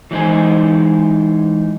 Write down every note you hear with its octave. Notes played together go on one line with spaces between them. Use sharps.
E3 F#3 G#3 D#4 C5 G#5